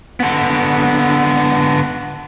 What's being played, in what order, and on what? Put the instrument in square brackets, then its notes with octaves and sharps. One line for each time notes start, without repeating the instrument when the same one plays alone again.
[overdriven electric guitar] D3 B3